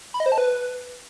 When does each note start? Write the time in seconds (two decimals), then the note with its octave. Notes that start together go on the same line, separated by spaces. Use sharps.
0.14 B5
0.20 D#5
0.26 C5
0.32 A5
0.38 B4